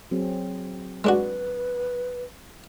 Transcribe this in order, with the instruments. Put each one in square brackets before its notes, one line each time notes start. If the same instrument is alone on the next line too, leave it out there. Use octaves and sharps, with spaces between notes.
[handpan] F#3 C4 G#4
[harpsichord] G#3 D4 F#4 [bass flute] B4